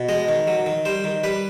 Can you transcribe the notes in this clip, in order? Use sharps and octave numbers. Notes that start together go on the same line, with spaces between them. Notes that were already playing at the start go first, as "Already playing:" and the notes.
Already playing: B2
G#3 D#5
D#3
F#3
D#3
G3 C5
D#3
G3 B4